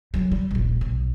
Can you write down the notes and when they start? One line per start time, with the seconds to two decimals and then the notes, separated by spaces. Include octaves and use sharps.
0.14 F#3 F4
0.32 G3
0.51 D#1 A#1
0.81 B1